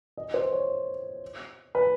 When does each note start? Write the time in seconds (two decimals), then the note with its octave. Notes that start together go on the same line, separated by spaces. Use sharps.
0.17 D#5
0.34 C5
0.53 C#5
1.75 B4